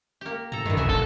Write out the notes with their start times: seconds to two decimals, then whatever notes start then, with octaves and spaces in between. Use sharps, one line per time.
0.21 A#3 G4
0.52 A2 A4 A#5
0.66 G2 D#3 E3
0.77 C2 A2 F#4 E5 G#5
0.89 F1 A4